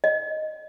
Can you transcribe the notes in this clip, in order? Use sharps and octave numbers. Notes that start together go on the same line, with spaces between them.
D#5